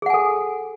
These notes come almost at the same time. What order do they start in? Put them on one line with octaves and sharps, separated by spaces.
G#4 F#5 G#5 A4